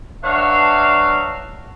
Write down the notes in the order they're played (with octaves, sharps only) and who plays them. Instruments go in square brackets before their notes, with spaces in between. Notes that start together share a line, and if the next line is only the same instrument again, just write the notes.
[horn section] F#3 D4 B4 C#5 E5 F5